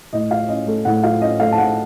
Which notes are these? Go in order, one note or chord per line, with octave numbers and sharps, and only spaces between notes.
A2 D#5
F4 F5
C#4 D#5
A3
A2 F#5
F4 F5
C#4 D#5
A3 F5
A5
A2 F#5